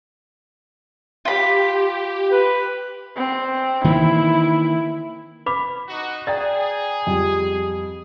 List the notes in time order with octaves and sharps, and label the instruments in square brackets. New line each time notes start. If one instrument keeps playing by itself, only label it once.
[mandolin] F4 B5 [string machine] G4
[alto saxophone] B4
[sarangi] C4
[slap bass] D#3 E3 A#3 [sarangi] E4
[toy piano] B4 B5 D6 [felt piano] B6
[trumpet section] D#4 F#4
[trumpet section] G#4 [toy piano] D5 [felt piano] G5 A#5 A6
[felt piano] F2 G3